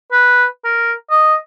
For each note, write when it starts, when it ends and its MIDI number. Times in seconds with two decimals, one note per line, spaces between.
0.12 0.45 71
0.64 0.92 70
1.11 1.35 75